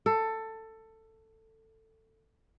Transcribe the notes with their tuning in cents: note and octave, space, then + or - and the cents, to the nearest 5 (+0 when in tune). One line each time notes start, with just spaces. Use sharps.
A4 +15